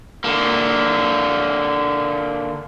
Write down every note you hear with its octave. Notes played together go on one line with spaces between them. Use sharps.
D3 A#3